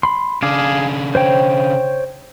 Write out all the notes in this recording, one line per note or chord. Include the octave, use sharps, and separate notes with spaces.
B5 C6
C#3 D4 G#4 F5 D6
C5 C#5 G5